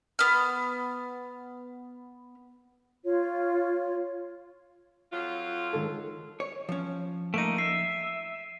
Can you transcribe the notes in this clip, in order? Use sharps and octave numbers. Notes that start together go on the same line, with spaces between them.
B3 F6
F4 C#5
F2 F#3 F4
D#3 G#3 A4
C#5
F3 C#4
A3 A#3 D#4 D7 D#7
E5 C7